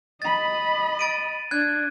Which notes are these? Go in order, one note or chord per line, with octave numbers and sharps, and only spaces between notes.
D#5 B5 A6
A6 D7 D#7
D4 F#6 G#6